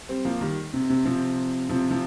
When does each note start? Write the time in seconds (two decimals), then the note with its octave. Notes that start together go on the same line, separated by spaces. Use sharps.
0.09 G3 C4
0.25 F3 A#3
0.41 D#3 G3
0.73 C3
0.90 C3
1.05 C3 F3
1.69 C3 F3
1.90 C3 F3